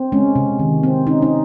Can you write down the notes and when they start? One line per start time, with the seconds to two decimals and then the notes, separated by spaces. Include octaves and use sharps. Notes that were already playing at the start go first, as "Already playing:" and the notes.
Already playing: C4
0.12 G#3 C#4
0.35 C3
0.59 D#3
0.83 C4
1.07 C#4 D#4
1.22 D#4